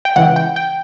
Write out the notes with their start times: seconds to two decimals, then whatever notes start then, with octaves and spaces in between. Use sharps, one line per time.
0.05 G5
0.16 C#2 C#3 E3 F#5
0.36 G5
0.56 G5